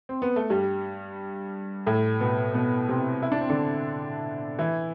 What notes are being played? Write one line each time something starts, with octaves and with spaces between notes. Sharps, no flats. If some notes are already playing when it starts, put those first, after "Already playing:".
C4
B3
A3
G2 G3
A2 A3
B2 B3
B2 B3
C3 C4
E4
D4
C4
D3 D4
E3 E4